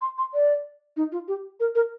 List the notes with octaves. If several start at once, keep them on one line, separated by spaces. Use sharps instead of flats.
C6
C6
D5
D#4
F4
G4
A#4
A#4